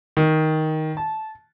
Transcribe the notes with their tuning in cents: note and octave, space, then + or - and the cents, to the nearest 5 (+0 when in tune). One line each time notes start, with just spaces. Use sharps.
D#3 +10
A5 -15